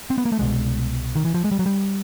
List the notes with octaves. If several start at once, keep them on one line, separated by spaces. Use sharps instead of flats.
C4
B3
A#3
A3
C2 B2 G#3
D#3
E3
F3
G#3
G3
F#3
G3